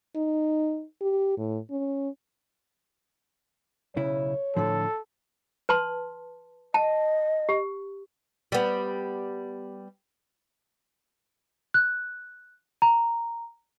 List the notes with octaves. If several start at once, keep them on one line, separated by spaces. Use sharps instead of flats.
D#4
G4
A2
C#4
B1 C#3 E4 C#5
A2 D3 F3 A4
B4 A5 C6
D#5 A5
G4
G3 B3
F#6
A#5